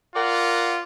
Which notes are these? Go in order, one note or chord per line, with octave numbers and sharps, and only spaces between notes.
F4 A#4 D5 F#5